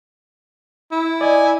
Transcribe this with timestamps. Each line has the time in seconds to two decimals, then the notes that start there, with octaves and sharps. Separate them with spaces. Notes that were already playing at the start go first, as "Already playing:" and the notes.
0.92 E4
1.21 D5 D#5 G#5